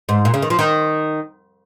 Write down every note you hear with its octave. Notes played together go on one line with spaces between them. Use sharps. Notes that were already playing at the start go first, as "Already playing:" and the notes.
G#2
A#2
C#3
D#3
F3
D#3